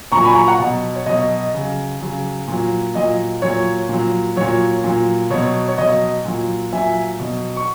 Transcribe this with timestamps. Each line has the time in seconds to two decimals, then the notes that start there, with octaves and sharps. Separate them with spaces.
0.12 A#2 A#5 C#6
0.17 F#3
0.24 G#5 B5
0.35 A#5 C#6
0.47 F#5 A#5
0.60 B2 F#3
0.96 C#5
1.06 B2 F#3 D#5
1.54 C#3 F#3
2.01 C#3 F#3
2.47 A#2 F#3
2.95 A#2 F#3 D#5
3.42 A#2 F#3 C#5
3.89 A#2 F#3
4.36 A#2 F#3 C#5
4.84 A#2 F#3
5.30 B2 F#3 C#5
5.68 C#5
5.78 B2 F#3 D#5
6.25 A#2 F#3
6.72 A#2 F#3 E5 G#5
7.20 B2 F#3
7.57 C#6